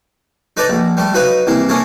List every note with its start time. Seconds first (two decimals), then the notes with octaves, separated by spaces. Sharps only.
0.57 D#4 A4 B4 D5 A5 A#5
0.69 A#1
0.97 G3 A3 A4
1.14 F#3 D#4 B4 F5 D#6
1.47 C2 E3 A#3
1.69 A#3 C#4 D4 E4 A4